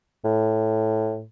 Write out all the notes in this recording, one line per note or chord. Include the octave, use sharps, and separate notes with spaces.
A2